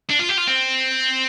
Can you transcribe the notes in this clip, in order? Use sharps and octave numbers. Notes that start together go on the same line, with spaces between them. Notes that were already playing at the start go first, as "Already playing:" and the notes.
D4
F4
G4
F4
C4